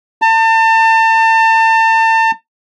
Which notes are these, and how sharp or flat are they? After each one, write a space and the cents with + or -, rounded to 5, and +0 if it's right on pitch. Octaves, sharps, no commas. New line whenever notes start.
A5 +35